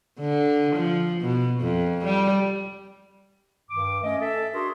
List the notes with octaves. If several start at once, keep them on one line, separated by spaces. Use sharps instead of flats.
D3
F3
B2
F2
G3
G2 D#3 D6
A3 C#4 D#5
A4 E5
D4 F#4 G#4 A#4 C6